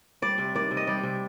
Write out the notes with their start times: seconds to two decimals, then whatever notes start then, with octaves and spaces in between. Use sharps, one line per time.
0.22 G3 D5
0.38 C3
0.55 D#3 D5
0.71 C3
0.77 D#5
0.87 G3 D5
1.03 C3